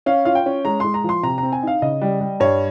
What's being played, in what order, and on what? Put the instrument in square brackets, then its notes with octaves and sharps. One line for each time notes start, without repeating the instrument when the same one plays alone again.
[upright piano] C#4 F5
F4 F5
G5
C#4
G#3 A#5
G#3 C6
A#5
F3 C6
C3 A#5
C4 A#5
G#5
D#4 F5
C#3 D#5
G3
G3
G2 C#5